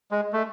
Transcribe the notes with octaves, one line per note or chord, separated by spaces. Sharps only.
G#3
A3